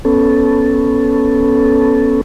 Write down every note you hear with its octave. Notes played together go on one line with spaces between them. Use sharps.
B3 C#4 A4